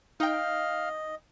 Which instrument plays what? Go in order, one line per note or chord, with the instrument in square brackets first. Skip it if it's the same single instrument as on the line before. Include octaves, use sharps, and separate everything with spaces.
[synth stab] D#4 G5 [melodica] D#5 [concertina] F5